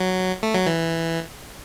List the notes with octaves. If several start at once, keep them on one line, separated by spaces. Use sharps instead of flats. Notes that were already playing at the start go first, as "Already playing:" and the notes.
Already playing: F#3
A3
F#3
E3